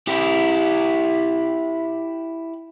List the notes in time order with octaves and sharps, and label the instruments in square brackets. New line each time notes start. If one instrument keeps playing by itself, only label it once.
[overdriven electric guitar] E4 G4